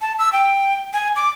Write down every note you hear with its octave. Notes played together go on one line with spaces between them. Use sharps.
A5
E6
G5
G#5
D6